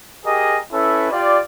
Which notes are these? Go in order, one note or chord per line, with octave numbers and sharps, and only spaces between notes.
G4 G#4 A#4 D#5
C#4 E4 A4 B4
F4 G4 D5